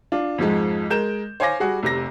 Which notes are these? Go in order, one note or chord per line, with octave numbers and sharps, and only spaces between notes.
D4 F4
F2 G#2 F3 G#3
G#3 A#4 G6 E7
C5 C#5 F5 G#5 D6 A#6
G3 F#4 G#4
F1 C3 A#6